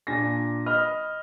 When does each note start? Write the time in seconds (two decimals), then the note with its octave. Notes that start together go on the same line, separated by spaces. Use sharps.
0.07 A#2 D4 G#5 A#6
0.66 D#5 B5 F6